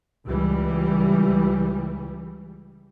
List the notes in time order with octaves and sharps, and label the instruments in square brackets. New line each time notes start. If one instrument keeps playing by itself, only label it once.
[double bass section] C#2 E3 G3